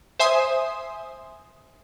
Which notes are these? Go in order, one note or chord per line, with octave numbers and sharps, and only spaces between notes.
C5 E5 G#5 C6 D#6